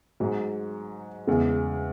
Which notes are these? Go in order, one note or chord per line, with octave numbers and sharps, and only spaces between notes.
G#2 F#3
E2 C#3 G#3